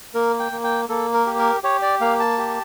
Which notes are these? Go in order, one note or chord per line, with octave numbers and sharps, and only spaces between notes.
A#3 A#4
G5
A#3
G5
A#3 A4
A#4
G4
A#4
G4 C#5
D5
A#3 F5
A5
G4